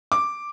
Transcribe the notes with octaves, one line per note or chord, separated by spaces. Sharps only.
D6